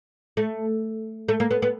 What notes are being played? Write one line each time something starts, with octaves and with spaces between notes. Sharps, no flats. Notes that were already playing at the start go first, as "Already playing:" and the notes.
A3
A3
A#3
B3
B3